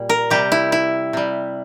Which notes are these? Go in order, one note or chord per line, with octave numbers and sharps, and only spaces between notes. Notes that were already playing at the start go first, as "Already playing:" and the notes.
Already playing: A#2 G3
A#4
C3 G3 G4
E4
E4
C3 G3